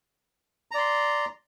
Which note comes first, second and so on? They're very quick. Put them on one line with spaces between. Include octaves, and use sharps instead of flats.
A#5 D5 C6